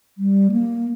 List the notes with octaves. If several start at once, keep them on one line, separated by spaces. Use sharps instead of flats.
G3
A#3